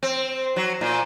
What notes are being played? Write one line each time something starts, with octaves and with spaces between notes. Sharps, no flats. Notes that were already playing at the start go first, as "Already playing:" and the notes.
C4
F#3
A#2